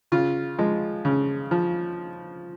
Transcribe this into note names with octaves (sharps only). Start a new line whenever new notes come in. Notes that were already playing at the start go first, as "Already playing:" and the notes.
C#3 F4
F3 G#3
C#3
F3